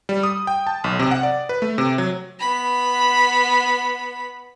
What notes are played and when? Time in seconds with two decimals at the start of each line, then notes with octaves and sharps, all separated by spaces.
0.09 G3
0.23 D#6
0.47 G5
0.67 A5
0.84 B1
0.99 C3
1.11 F#5
1.23 D5
1.49 B4
1.62 A3
1.78 C3
1.98 F#3
2.39 B3 B5